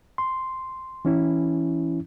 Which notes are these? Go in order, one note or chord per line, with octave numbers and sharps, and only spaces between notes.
C6
E3 C#4 E4